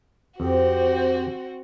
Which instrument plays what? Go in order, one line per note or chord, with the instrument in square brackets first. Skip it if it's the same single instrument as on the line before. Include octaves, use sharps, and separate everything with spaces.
[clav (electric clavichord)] F2 [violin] C4 F#4 [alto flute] G4 [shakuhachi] C5